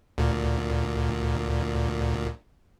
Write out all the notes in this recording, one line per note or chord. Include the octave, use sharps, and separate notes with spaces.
D2 A#2